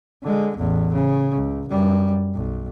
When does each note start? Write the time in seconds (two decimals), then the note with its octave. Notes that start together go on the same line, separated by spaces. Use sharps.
0.23 D3 G#3
0.57 A1 E2
0.93 C#3
1.35 C#2
1.68 F#2 G3
2.34 B1